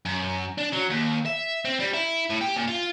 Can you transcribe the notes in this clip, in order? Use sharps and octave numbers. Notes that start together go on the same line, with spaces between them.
F#2
D4
F#3
D#2
E5
C4
G3
E4
A2
G4
A#2
F4